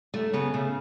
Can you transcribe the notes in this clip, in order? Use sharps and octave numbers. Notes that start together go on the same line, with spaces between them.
F#2 A3
C#3 B3
C#3 A3